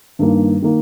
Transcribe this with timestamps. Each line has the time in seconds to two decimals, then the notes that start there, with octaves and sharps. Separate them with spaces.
0.19 G2 D#3 A#3
0.62 D#3 A#3